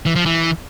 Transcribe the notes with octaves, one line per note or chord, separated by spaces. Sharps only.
E3
F3
E3